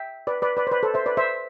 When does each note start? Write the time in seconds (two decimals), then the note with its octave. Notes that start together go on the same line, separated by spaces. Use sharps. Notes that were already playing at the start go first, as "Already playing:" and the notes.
Already playing: E5 G5
0.27 B4 D5
0.42 B4 D5
0.57 B4 D5
0.67 C5
0.72 B4 D5
0.83 A4 C5
0.94 C5 E5
1.06 B4 D5
1.17 C5 E5